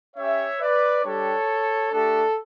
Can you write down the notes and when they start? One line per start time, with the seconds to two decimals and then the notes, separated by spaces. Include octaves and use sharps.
0.16 C#4 G4 C#5 E5
0.60 B4 D5
1.04 G3 D4 G4 A4 C#5
1.92 A3 D4 G4 A4